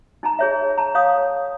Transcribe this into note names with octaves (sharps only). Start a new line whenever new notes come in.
D#4 A5 A#5
G#4 C#5 E5
A5 A#5
G#4 C#5 F5 D#6